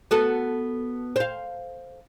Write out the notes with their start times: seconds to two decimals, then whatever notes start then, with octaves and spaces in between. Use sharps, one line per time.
0.11 B3 F#4 A4
1.16 C5 F5